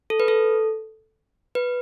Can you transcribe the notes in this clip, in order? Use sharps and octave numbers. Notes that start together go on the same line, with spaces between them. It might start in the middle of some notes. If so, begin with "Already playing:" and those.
A4
B4
A4
B4